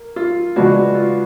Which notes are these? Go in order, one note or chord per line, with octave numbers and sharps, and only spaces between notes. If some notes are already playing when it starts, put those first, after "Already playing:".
Already playing: A#3
F4
C#3 F3 G#3 B3 D4 F#4
F4